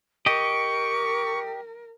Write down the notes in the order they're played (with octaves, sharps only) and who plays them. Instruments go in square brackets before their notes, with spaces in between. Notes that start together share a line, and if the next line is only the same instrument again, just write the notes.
[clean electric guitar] G4 D#5 [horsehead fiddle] A#4 [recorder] C#6